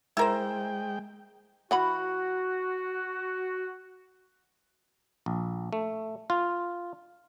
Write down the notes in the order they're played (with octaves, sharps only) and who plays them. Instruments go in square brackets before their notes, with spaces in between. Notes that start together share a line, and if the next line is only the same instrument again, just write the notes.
[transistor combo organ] G#3 G5 [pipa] E4 A#4 C5
[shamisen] E3 F#5 B5 [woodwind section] F#4
[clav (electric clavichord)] A#1
A3
F4